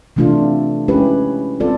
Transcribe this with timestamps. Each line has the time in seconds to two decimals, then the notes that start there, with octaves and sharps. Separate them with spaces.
0.16 C3 E3 A3 D4 F4
0.88 G#3 C#4 E4 G4 B4
1.60 G3 C4 F4 A4 D5